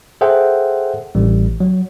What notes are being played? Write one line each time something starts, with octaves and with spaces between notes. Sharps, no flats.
G#4 A4 C5 E5 F#5 G5
A1 G3
F#3